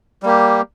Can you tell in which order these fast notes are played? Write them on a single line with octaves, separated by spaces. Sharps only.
G3 A#3 G4